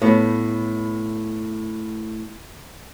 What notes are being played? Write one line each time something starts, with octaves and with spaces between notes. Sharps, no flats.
A2 B3